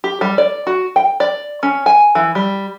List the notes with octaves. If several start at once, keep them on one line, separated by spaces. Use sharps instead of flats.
G4
G3
D5
F#4
G5
D5
C#4
G#5
E3
G3